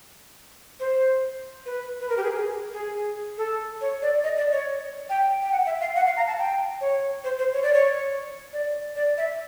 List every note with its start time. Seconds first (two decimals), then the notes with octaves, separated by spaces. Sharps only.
0.80 C5
1.66 B4
2.00 B4
2.09 A#4
2.17 G4
2.23 G#4
2.37 G#4
2.73 G#4
3.38 A4
3.81 C#5
4.02 D5
4.23 D#5
4.37 D5
4.52 C#5
5.10 G5
5.41 G5
5.52 F#5
5.66 E5
5.81 F5
5.96 F#5
6.06 F5
6.17 A#5
6.27 A5
6.39 G5
6.81 C#5
7.24 C5
7.39 C5
7.53 C#5
7.63 D5
7.74 C#5
8.53 D5
8.96 D5
9.17 E5